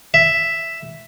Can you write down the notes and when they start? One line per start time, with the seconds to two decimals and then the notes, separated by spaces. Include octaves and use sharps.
0.14 E5